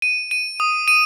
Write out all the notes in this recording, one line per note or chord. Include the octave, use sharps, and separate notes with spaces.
D#7
D#7
D#6
D#7